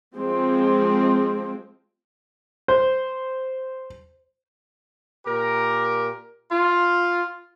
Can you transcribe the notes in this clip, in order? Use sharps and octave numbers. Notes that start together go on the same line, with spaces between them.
F3 G#3 C4
C5
A#2 G4 A#4
F4